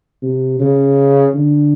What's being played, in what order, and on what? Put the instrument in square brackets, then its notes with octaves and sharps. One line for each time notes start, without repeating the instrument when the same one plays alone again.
[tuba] C3
C#3
D3